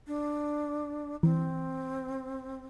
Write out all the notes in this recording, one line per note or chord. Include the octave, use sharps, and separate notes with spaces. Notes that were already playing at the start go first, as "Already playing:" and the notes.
D4
E3 C4